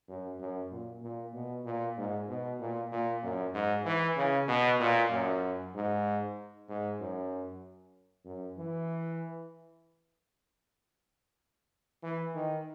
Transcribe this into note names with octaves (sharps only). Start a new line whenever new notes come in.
F#2
F#2
A#2
A#2
B2
A#2
G#2
B2
A#2
A#2
F#2
G#2
E3
C#3
B2
A#2
F#2
G#2
G#2
F#2
F#2
E3
E3
D#3